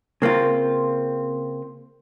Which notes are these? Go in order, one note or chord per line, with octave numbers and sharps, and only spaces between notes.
C#3 A#3 C4 F4